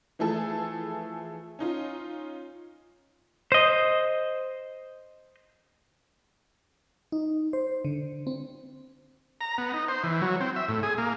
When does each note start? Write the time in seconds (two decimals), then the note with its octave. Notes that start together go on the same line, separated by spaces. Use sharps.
0.19 E3 F3 A3 E4 G#4 A4
1.59 C#4 D#4 F4
3.52 C5 D#5
7.12 D#4
7.53 C5
7.85 D3
8.27 C4
9.41 A#5
9.58 B3
9.74 D#4
9.88 C5
10.04 E3
10.22 F#3
10.41 C4
10.56 E5
10.69 A2
10.83 G#4
10.98 A#3